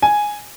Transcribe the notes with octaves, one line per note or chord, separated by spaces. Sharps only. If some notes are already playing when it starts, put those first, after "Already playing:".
G#5